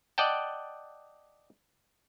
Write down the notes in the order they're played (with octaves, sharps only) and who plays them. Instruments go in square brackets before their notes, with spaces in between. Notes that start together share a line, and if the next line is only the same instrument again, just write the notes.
[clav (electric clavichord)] D5 D#5 F#5 G5 A5